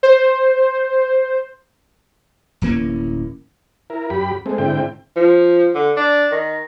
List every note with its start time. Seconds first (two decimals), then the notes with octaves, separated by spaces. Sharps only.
0.03 C5
2.62 D1 E3 A#3 C#4
3.90 E4 A#4
4.10 F#2 G4 B5
4.46 G#3 A3 C4
4.58 G#2 D3 C4 E4 G5
5.16 F3
5.75 D3
5.97 D4
6.32 D#3